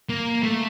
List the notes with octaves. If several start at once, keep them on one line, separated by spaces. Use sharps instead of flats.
A#3
A3